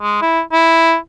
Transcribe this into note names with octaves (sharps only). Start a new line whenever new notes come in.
G#3
E4
E4